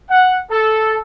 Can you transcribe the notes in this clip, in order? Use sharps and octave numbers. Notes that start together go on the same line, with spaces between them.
F#5
A4